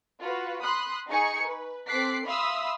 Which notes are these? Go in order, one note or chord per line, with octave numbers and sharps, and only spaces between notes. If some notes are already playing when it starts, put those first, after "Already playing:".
F4 F#4 B4
B5 C6 D#6 F#6
D#4 G#4 G#5 C#6 C#7
B4
C4 A4 D6 F#6 B6 C7
E5 F5 B5 C6 D#6 E6